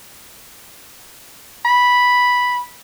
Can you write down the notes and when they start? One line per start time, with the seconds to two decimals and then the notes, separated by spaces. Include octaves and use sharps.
1.65 B5